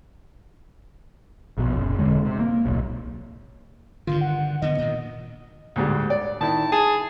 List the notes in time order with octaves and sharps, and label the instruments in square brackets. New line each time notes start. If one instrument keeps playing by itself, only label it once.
[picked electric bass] A#1 B2
F#1
E1 D3 G#3
C3
A#3
D1 B1
[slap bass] G2 D3 D#3 [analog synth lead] F4
[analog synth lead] F#5
[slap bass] D3 E3 B3 [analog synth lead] D#5
[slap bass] A#2 D#3
[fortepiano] D2 G#2 G3
D5
[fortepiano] D#3 E4 [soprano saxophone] A5
[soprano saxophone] G#4 [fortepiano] A5